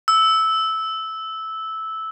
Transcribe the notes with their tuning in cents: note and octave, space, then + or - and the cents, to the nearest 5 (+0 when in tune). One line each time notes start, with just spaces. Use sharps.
E6 -10